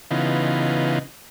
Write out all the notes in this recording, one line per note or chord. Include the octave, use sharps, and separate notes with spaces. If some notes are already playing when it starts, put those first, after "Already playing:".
C#3 E3 B3 D#4 F4